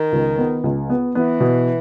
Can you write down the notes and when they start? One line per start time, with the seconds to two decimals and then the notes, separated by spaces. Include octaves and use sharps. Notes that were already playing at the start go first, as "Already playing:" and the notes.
Already playing: D#3
0.12 C#2
0.38 B3
0.64 C#2
0.90 B3
1.15 E3 B3
1.40 B2